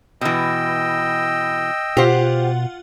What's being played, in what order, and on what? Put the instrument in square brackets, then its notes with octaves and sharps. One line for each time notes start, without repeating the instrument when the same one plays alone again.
[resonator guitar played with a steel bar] B2 E3 [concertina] D#5 G5 E6
[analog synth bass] B2 [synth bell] F4 F#5 [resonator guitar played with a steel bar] G4 C5